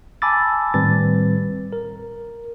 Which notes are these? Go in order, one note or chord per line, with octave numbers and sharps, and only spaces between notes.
G#5 A5 B5 D6 E6 A6
A2 D#3 G3 C4 B4 A6
A#4